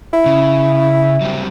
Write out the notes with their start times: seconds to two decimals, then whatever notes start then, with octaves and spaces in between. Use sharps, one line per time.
0.13 E4
0.26 C#3
1.21 F#3 G3 C4